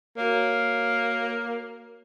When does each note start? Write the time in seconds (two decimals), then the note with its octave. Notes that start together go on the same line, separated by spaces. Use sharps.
0.17 A#3 F#4 C#5